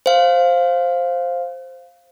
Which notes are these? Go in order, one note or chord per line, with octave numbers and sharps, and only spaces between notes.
C5 F5